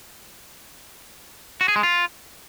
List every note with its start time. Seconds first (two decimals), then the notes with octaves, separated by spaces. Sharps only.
1.61 F#4
1.68 G#4
1.76 G#3
1.83 F4